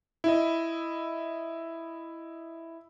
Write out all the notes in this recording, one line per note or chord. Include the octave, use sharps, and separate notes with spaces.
E4 D#5